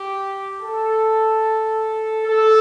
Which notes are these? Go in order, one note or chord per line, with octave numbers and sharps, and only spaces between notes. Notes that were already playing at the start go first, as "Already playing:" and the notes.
Already playing: G4
A4
A4